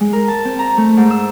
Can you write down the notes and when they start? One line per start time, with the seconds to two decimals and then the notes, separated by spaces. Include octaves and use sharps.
0.01 G#3
0.13 A#4
0.28 A5
0.45 C4
0.59 A#5
0.77 A3
0.97 G#2
1.11 E6